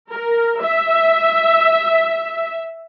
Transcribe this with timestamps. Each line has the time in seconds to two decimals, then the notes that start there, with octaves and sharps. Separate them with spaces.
0.11 A#4
0.61 E5